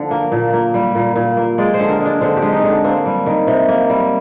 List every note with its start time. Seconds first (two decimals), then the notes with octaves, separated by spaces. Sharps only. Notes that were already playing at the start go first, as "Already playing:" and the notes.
Already playing: D3 F3
0.11 A#3
0.32 A#2
0.53 A#3
0.74 G3
0.95 A#2
1.16 A#2
1.37 A#3
1.58 G#3 D5
1.74 C5
1.79 D3
1.90 A#4
2.00 G#3
2.05 D4
2.21 D3 C4
2.37 G4
2.42 G#3
2.53 D#4
2.63 D3
2.68 D4
2.84 A#3 C4
3.06 G3
3.26 D#3
3.47 C3
3.68 A#3
3.89 G3